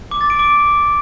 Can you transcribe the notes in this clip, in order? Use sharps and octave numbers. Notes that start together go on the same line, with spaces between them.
D6
A6
D7
D6